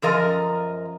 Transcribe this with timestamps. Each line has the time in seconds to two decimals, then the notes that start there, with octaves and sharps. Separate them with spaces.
0.02 F#2 F3 A#4 D#5